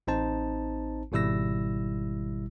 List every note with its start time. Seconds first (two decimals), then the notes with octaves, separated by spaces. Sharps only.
0.07 A1 C4 D#4 C5 A5
1.12 G#1 B2 G3 E4 E6 A#6